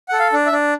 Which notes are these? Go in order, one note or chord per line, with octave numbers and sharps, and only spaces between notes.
A4 F#5
F5
D4
E5
D4